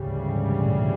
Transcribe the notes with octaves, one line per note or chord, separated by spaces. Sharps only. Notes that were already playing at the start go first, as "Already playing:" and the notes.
Already playing: D2 G#2 C#3 E3 G3
G#2
A#2